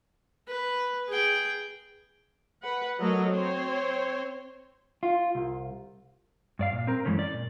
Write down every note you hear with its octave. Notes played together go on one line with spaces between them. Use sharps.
B4
G#4 G5
B4 F#5
F#3 A3 A4 A#4 D#5
C4 C5 C#5
F4
C2
G2 D5 F5
A#2
C4 A#4
F#2 A#2 E3 G#3 A3 C#4
D5
A#2